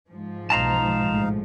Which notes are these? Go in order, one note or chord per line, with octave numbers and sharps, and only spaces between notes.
G#2 F3
B1 B2 D#4 F5 A5 A#5 C6
A1 G#3 A3